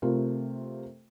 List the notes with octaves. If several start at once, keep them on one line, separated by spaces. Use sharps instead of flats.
C3 A3 F4 A#4